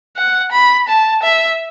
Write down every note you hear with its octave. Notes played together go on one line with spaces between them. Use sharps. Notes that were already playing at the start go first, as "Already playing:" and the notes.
F#5
B5
A5
E5